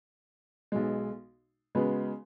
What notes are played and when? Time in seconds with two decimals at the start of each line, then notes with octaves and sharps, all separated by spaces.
0.72 B1 B2 G#3
1.75 C#3 G#3 B3 F#4 B4